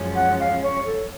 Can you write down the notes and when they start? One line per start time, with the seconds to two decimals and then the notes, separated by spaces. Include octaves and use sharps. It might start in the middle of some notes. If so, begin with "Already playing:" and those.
Already playing: F#2 F3 G#3 C#4
0.16 F#5
0.41 F5
0.64 C#5
0.87 A4 C#5